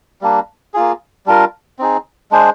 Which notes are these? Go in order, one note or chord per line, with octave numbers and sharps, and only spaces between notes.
G3 A#3 D4
A#3 F4 G#4
G3 D4 F4 A#4
C4 D#4 G#4
G#3 D4 G#4 C5